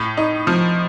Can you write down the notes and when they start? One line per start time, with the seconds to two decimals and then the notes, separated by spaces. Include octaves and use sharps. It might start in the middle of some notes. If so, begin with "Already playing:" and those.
Already playing: A2
0.17 D#4
0.47 F3